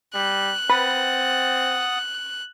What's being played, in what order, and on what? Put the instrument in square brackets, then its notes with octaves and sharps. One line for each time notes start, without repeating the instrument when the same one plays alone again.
[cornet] G3 [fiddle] F#6
[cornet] C4 [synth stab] B4 [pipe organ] F#5 D#6 A6